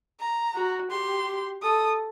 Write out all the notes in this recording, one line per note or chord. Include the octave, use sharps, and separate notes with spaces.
A#5
F#4
G4 C6
A4 D#6